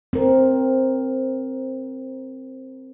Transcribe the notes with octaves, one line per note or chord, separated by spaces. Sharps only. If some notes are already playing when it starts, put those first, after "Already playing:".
C4 A#4